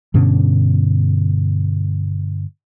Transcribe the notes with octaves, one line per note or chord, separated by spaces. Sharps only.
G2 B2 D3 C#4